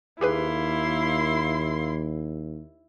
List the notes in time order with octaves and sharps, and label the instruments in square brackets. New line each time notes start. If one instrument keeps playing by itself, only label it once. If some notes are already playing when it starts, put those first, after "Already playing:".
[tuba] D#2 [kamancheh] A#3 C6 [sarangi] E4 [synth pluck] G4 G#4 B4